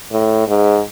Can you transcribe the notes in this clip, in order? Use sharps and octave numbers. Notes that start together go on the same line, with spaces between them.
A2
G#2